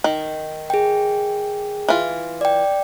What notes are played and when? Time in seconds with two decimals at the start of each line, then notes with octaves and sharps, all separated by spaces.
0.04 D#3
0.70 G#4 G5
1.89 E3 F4
2.41 D5 G5